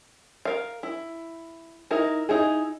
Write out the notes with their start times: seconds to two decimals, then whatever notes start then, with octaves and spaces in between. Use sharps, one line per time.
0.45 A#4 F5
0.83 E4
1.91 D#4 E4 A#4
2.29 D#4 E4 G#4